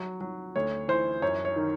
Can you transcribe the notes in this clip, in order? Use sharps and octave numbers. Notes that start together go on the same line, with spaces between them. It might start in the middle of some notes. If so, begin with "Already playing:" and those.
Already playing: F#3
F#3
D2 C#5
E3 C5
F#2 C#5
C#5
D#3